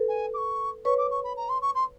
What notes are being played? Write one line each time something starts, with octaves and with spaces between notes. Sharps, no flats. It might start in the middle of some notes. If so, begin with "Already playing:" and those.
Already playing: A4 B4
G#5
D6
C#6
B4 C#5 C#6
D6
C#6
B5
A#5
C6
C#6
C6